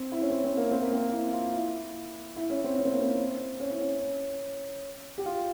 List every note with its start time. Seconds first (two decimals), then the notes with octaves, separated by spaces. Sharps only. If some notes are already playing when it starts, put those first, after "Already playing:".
Already playing: C4
0.12 E4
0.21 C#4
0.30 C4
0.44 C4
0.57 A#3
0.71 C4
0.82 A#3
0.93 C4
1.12 E4
1.33 F4
1.53 E4
2.36 E4
2.50 C#4
2.64 C4
2.78 C#4
2.85 C4
2.93 A#3
2.99 C4
3.60 C#4
3.70 E4
3.81 C#4
5.18 G4
5.26 F4